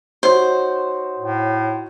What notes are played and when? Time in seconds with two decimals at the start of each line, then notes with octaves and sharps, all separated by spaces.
0.23 D#4 F#4 C5 C#5
1.19 A2